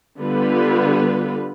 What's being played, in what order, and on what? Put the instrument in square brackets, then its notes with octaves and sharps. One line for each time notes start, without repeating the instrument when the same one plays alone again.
[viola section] D3 G3 B3 F4 B4